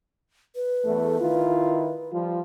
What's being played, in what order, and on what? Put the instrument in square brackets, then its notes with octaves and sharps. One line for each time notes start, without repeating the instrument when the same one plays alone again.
[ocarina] B4
[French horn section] E2 A3
D#3 E4 F4
F3 G3 F4